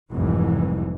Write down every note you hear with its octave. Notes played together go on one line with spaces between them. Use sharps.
F1 C2 G#2 E3